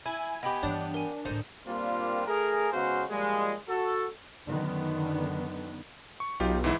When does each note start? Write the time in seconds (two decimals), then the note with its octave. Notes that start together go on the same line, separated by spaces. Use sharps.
0.06 E4 G#5
0.43 B3 G4 D#5 G5 B5
0.63 G2 E3 D4 C#5
0.94 A#4 G#5
1.25 D2 A2 D#4 A4 C5
1.67 A#2 G3 A#3 C4 D4 F4
2.27 A3 G#4 A#4
2.72 C#3 G#3 B3 F#4 C5 F5
3.10 A#2 F3 G3 G#3
3.68 F#4 A4
4.46 F#2 D3 D#3 B3
6.20 C#6
6.40 B1 D#4 F4 G4
6.64 G#2 E3 E4